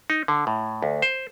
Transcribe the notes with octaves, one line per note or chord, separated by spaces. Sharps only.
D#4
D3
A2
D2
C5